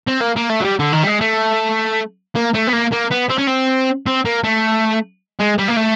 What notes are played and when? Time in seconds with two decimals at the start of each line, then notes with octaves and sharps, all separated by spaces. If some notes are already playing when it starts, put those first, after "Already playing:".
0.08 C4
0.21 A#3
0.36 A#3
0.50 A3
0.60 F#3
0.64 G3
0.79 D3
0.92 D#3
1.03 G3
1.07 G#3
1.21 A3
2.36 A#3
2.54 A3
2.68 B3
2.73 A#3
2.93 A#3
3.11 B3
3.30 C4
3.38 C#4
3.47 C4
4.07 C4
4.25 A#3
4.44 A3
5.39 G#3
5.58 G3
5.68 A#3
5.77 A3